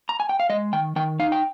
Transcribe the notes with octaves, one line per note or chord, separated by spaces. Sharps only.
A#5
G#5
G5
F5
G#3 D#5
D#3 G5
D#3 G5
D#4 F5
G5